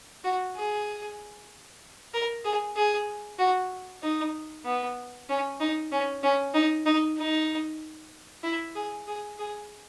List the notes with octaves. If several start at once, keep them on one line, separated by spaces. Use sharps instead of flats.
F#4
G#4
A#4
G#4
G#4
F#4
D#4
B3
C#4
D#4
C#4
C#4
D#4
D#4
D#4
E4
G#4
G#4
G#4